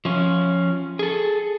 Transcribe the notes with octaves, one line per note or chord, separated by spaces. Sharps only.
F3 C#4
G#4 A4